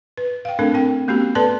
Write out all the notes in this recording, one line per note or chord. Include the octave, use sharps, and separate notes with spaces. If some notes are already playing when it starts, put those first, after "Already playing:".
B4
F5 G5
A3 C4 D4 A4 A#4
C4 G5
A3 B3 C#4 F#4 G4
A4 B4 D5 A5 C6